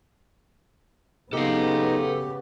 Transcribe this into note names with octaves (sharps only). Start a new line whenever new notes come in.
C#3 B3 D#4 G4 A4 F5